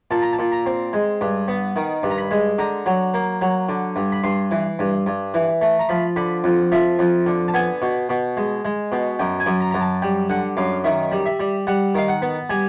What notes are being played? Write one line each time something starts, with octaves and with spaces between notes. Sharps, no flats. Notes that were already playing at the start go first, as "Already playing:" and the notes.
A#2 A5
A#5
A5
A#2
A#5
C4
G#3
G2
B3
D#3
G2
A#5
B5
G#3
D3 A#5
F#3
A#3
F#3
D3
G2
B5
G2 C6
E3
G2
G2
E3
A3
A#5
F3 B5
D3 B5
F2
F3 E5
F2
D3
A5
B3 G#5
B2
B2
G#3
G#3
B2
F#2 G5
G#5
F#2
A#5
F#2 A#5
A5
G3 G5
D3 F#5
F#2 F5
D#3 E5
G3
E5
G3
G3 F#5
D#3 F5
F#5
B3
G3 G#5